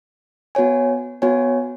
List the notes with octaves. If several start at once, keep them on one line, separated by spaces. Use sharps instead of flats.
B3 F#4 C#5 G#5
B3 F#4 C#5 G#5